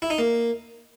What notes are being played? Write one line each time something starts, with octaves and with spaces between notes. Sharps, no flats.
E4
D#4
A#3